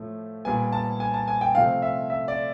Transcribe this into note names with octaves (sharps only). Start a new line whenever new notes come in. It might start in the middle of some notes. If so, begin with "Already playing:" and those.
Already playing: A2 F3 A3
A#2 G3 B3 G#5
A5
G#5
A5
G#5
G5
C3 F3 A3 C4 F5
E5
E5
D5